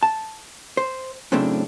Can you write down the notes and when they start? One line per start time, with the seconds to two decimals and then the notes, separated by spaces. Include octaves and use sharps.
0.03 A5
0.77 C5
1.32 F#2 A2 C#3 A3 C4 D4